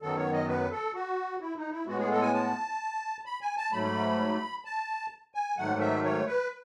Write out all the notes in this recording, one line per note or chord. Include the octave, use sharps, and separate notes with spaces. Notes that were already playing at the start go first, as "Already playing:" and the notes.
F#2 D#3 F#3 B3 A4
C#5
D#5
B4
A4
F#4
E4
D#4
E4
A2 G#3 B3 F#4
G#4
A4
G#5
A5
B5
G#5
A5
G#2 F#3 A3 B5
A5
G#5
G#2 D#3 F#3 A3 F#5
E5
C#5
B4